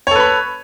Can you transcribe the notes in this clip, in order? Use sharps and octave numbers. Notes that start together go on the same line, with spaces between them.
A4 B4 C#5 B5